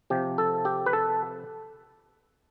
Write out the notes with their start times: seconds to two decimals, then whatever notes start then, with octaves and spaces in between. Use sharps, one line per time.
0.10 C3 F3 G4
0.38 A4
0.65 G4
0.86 B4
0.93 A4